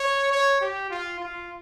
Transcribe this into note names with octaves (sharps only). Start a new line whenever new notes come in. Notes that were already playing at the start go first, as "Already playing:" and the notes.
Already playing: C#5
C#5
G4
F4
F4